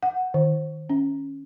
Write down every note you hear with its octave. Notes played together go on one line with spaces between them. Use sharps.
F#5
D#3
C#4